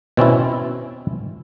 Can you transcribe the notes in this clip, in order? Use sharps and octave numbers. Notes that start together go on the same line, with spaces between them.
B2 C4 C#4 E4